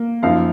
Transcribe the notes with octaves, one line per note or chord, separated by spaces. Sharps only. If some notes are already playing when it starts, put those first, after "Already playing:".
Already playing: A#3
F#2 F3 A#3 D#4 F5